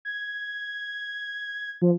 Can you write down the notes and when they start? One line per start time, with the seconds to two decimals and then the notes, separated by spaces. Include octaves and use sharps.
0.05 G#6
1.82 F3